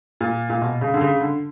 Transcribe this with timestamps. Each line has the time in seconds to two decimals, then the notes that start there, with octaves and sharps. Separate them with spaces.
0.21 A#2
0.50 A#2
0.62 B2
0.81 C#3
0.94 D3
1.01 C#3
1.21 D3